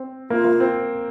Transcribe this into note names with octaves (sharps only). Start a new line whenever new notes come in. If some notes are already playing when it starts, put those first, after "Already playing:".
Already playing: C4
A#3 F4
A#3
C4